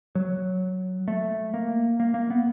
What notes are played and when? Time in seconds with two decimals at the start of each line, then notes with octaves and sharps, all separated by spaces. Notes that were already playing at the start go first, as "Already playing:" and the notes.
0.15 F#3
1.08 A3
1.54 A#3
2.00 A#3
2.14 A#3
2.30 B3